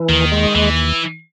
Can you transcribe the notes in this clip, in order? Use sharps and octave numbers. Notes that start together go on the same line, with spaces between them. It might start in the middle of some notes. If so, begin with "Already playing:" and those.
Already playing: E3
D#2 D#3
G#3
D#2 E3